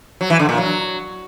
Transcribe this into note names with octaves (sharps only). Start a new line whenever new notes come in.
F#3
E3
D3
A#2
F#3